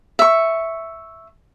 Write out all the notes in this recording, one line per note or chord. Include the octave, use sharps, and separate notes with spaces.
E5 C#6